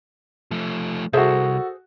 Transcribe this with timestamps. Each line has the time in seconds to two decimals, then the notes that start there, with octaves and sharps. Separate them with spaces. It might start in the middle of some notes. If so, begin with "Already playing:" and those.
0.51 F3 A3
1.13 C2 F#4 G#4 A4 C5 E5